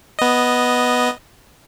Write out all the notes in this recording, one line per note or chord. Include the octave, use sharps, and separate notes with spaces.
B3 D#5